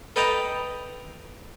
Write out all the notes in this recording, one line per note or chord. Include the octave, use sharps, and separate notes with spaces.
A4 B4 D#5 G5 A5 A#5